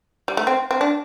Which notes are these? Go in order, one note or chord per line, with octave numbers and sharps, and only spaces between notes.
G3
A3
C4
C4
D4